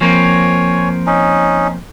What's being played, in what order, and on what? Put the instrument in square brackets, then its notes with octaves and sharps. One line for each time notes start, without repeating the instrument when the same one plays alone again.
[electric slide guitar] F3 A#3 C4 [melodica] C#5 G#5
[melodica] C#4 D#4